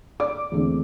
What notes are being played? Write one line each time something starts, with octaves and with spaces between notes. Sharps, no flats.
D5 D6
E2 D3 A3 C4